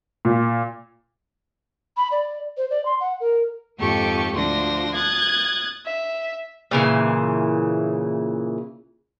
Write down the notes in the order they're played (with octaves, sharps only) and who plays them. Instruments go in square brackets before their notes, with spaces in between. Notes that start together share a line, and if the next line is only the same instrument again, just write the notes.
[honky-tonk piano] A#2
[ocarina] B5
D5
C5
D5
C6
F#5
A#4
[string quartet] F2 G#2 D#3 G4 A4 C#6
D2 F3 D4 C6 A#6
D#6 F#6 G#6 A6
E5
[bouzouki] A#2 C#3 E3